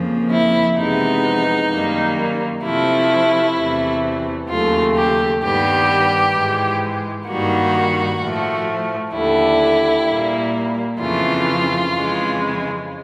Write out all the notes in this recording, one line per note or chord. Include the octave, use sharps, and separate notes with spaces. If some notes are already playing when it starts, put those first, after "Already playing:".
Already playing: F2 C#3 F3 A#3
E4
F2 C3 E3 G#3 B3 D#4
F#2 D#3 G3 A#3
C3 F3 A3 E4
E2 C3 E3 A3
D#2 C#3 F#3 A3 F4
G4
G2 D#3 G3 B3 G4
G#2 E3 G#3
G2 D#3 G3 A#3 F#4
A2 F3 A3
D#2 D3 G3 E4
A#2 G3 A#3
F2 C#3 E3 A3 F4
F2 C#3 E3 G#3